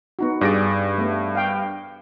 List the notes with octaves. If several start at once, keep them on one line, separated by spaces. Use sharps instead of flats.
B3 D#4 F#4
G2 G#4 D5 A#6 D7
A3 B3
F5 G5